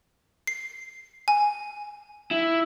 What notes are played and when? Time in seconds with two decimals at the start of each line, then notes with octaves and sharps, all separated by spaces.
0.47 C7
1.28 G#5
2.31 E4